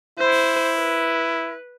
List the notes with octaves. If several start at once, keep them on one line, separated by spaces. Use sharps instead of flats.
E4 C5
B4